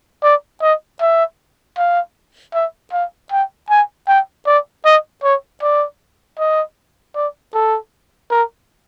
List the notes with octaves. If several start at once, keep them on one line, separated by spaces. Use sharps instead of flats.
D5
D#5
E5
F5
E5
F5
G5
G#5
G5
D5
D#5
C#5
D5
D#5
D5
A4
A#4